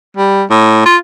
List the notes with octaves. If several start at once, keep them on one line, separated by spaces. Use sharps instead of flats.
G3
A2
F4